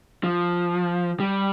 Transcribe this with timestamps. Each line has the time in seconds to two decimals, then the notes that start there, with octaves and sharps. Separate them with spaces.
0.24 F3
1.20 G3